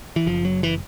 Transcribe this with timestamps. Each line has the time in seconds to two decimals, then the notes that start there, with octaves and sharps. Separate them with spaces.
0.16 E3
0.26 F#1 F3
0.45 F#3
0.63 E3